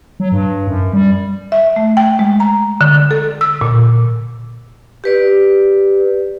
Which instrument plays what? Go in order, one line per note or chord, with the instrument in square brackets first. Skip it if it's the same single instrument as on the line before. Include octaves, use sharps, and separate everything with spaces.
[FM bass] F#3
G2
F#2
G3
[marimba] E5
A3
G5
G#3
A#5
D3
A4
E6
A#2
[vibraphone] G4 B4 D5